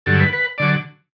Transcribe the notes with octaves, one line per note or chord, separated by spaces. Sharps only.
G2 D3 F#3 A4
B4
B4
D3 F#3 D5